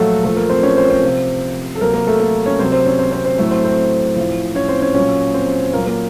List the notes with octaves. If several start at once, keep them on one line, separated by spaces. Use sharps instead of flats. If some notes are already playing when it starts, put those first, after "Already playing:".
Already playing: A#2 F3 F#3 A3 F4 F#4 A4
A#2 F3 A3 A4
A#3 A#4
C4 C5
C#4 C#5
C4 C5
C4 C5
C3 F3
A4
C3 F#3 A#3 A#4
A#3 A#4
A3 A4
A#3 A#4
C#4 C#5
C3 F#3 C4 C5
C4 C5
C#4 C#5
C4 C5
C4 C5
C4 C5
A2 F#3 A3 A4
C4 C5
C4 C5
A2 F3
C#4 C#5
C4 C5
C#4 C#5
A#2 F#3 C#4 C#5
C4 C5
A#2 F#3 A#3 A#4
A#3 A#4